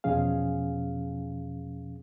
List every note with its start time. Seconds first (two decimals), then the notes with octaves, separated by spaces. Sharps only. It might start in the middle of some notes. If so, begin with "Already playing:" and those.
0.04 E2 B2 F3 C#4 G#4 F5